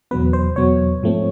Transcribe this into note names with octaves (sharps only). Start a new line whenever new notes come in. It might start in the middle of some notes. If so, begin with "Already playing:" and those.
E2 B2 F#3 B3 B4
C5
E2 B2 F#3 B3 C#5
G#2 F3 A3 C4